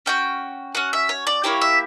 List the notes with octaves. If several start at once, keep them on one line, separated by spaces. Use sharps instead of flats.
C#4 F#4 G5
C#4 F#4 F#5
E5
C#5
D5
A#3 E4 G4 C#5
E5